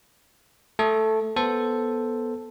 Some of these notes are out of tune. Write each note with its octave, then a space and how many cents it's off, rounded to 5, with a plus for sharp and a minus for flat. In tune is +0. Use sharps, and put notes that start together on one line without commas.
A3 +0 A4 -5
B3 -10 A4 +0 C5 +0